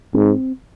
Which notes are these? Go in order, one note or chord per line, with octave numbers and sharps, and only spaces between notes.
G#2 C4